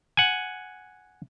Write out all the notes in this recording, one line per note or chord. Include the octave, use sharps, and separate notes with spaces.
F#5 G#5